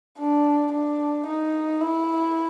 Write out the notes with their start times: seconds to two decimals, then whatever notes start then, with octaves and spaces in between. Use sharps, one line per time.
0.18 D4
0.72 D4
1.27 D#4
1.81 E4